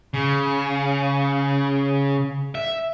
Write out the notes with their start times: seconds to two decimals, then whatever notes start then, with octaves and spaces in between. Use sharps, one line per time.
0.14 C#3
2.55 E5